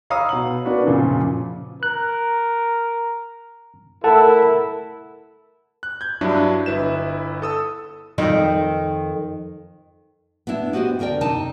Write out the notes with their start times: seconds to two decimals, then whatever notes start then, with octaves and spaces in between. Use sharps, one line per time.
0.10 C#5 F5 A#5 B5 D#6 E6
0.29 B2 F#5 F#7
0.65 A#3 B3 D4 F#4 B4
0.87 F#2 A#2 C#3 F3
1.83 A#4 F#6
4.04 A3 E4 A4 A#4 F#5 A5
5.83 F#6
6.01 G6 G#6
6.21 G2 F#3 D4 E4
6.66 G1 E4 B4 E7
7.42 A4 D#6 E6
8.18 F2 D#3 D#4
10.47 B3 D4 E4 E5
10.73 B3 F#4 G4 C5 D#5
10.99 D2 D3 A#4 D5 G5
11.21 C3 D#4 A5